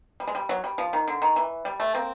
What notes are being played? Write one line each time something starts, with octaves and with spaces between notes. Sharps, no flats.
G3
G#3
G3
F#3
G3
F3
D#3
D3
D#3
E3
G3
A3
A#3 C4